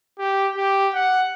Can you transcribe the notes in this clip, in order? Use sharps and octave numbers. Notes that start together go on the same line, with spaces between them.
G4
G4
F#5